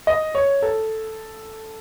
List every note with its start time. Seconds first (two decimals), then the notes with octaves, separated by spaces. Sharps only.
0.07 D#5
0.35 C#5
0.62 A4